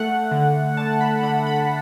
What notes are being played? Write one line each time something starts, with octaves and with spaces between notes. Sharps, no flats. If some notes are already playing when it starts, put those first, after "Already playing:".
Already playing: A3 F#5
D3
D3 A5
B5
D3 B5
B5